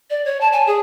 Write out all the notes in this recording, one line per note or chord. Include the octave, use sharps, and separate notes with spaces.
D5
C#5
A5
G#5
G#4